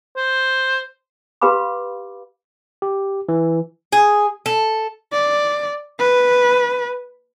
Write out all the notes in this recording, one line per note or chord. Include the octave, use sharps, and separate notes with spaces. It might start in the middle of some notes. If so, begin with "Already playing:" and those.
C5
G4 B4 F5 B5 D6
G4
E3
G#4
A4
D5
B4